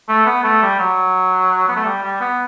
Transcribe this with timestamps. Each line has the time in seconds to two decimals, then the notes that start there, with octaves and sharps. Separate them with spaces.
0.09 A3
0.26 B3
0.44 A3
0.63 G3
0.80 F#3
1.68 B3
1.76 A3
1.85 G3
2.03 G3
2.21 B3